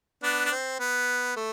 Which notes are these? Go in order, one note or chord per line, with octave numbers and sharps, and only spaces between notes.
B3 D4
D4
C4
B3
A3